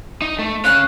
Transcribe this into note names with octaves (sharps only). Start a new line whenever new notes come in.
D#4
A3
C#4 F5 F#6